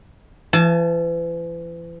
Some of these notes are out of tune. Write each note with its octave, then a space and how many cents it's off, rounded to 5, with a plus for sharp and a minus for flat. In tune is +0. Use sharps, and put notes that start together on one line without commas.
E3 +40 A5 -10